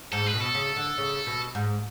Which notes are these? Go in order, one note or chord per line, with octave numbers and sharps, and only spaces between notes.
G#2 A4
B4
B2
A4
C#3
D3
C#3
B2
G#2